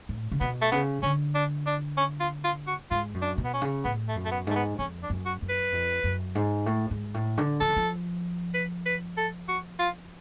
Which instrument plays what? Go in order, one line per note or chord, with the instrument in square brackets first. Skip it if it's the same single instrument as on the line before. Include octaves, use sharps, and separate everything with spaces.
[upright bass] A2
C#3
[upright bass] B2 [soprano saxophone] B3
[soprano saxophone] A3
[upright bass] C#3 [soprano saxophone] B3
[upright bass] D3 [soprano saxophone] C#4
[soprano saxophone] D4
D4
C#4
F4
F4
F#4
[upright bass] G#2 [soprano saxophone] F4
[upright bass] F#2
[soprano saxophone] D4
[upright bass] B2
[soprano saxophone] B3
C#4
[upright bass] C#3
[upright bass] A2 [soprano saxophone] B3
[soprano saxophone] A3
[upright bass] F#2
[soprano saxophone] A3
B3
[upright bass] G#2 [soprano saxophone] A3
[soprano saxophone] B3
[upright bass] F2 [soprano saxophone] C#4
[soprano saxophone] D4
[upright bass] F#2
[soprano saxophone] F#4
[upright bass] F#2
[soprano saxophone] B4
[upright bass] F2
F#2
G#2
A2
G#2
A2
D3
[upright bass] F3 [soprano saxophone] A4
[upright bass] D3
F3
[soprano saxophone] B4
B4
A4
F#4
F4